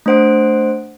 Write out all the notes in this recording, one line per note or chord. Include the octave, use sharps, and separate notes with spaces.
A3 D4 C5 F#5 D7